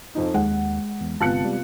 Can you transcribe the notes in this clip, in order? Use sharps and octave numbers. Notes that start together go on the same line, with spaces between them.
F2 F3 D#4
D#2 G#3 F#5
E2
G1 C3 B3 F4 A5 F#6 C#7
G3